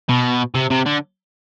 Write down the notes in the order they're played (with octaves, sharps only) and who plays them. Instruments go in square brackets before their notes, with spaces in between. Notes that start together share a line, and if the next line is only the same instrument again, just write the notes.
[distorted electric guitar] B2
C3
C3
D3